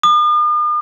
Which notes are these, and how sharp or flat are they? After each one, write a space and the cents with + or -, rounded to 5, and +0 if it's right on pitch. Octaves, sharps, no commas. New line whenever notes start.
D#6 -45